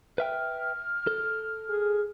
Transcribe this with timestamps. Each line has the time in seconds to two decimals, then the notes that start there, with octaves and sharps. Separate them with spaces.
0.18 B4 E5 G5 F6
1.07 A4
1.69 G#4